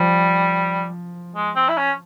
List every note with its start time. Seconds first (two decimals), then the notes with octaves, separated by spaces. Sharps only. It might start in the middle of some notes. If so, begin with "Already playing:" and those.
Already playing: F3 G3
1.35 G#3
1.56 C4
1.69 E4
1.77 C#4